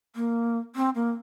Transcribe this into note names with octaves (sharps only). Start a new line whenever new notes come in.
A#3
C4
A#3